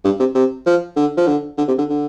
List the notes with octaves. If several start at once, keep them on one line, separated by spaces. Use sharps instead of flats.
G2
C3
C3
F3
D3
F3
D3
D3
C3
D3
D3